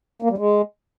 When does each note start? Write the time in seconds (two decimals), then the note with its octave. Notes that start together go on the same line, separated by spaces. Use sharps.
0.22 A#3
0.30 G3
0.38 G#3